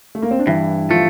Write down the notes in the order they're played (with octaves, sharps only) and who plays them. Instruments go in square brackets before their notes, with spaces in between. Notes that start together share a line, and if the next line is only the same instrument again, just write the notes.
[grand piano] A3
A#3
C4
D4
[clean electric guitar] G2 [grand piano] E3 E4
[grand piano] F3 F4 [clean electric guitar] A3